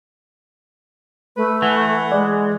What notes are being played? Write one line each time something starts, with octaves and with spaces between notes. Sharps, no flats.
A3 B4
E3 F#5
G#3 D5